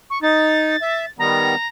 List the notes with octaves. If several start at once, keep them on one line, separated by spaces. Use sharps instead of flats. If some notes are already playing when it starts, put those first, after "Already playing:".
C#6
D#4 A6
E5
D#3 G3 B3 A#5